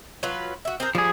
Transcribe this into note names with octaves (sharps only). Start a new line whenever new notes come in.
F#3 F4 B4
F#4 E5
C4 G#4 A#4
F3 G3 G#4